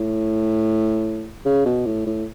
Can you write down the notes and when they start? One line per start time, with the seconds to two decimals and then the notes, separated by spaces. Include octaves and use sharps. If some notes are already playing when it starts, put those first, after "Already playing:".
Already playing: A2
1.45 C#3
1.65 B2
1.86 A2
2.07 A2